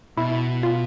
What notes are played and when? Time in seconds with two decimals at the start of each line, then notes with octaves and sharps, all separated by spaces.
0.17 B2 E4
0.63 F4